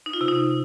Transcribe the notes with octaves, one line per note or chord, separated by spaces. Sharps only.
D#4
F4
C3
D#4